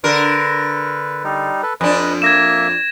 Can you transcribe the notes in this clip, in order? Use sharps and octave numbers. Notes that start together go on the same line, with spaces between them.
D3 A#4 B4
G3 D#4
A4 B4
F2 D4 B4 D#5
A#3 E5 G#6 A#6 E7